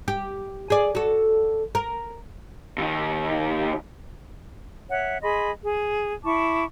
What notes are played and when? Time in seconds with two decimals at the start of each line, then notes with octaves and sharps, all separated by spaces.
0.08 G4
0.70 G#4 D5
0.95 F#4 A4
1.75 A#4
2.78 D#2 D#3
4.88 C#5 E5 F#5
5.21 G#4 D#5 B5 C6
5.62 G#4
6.23 E4 A5 C#6 D6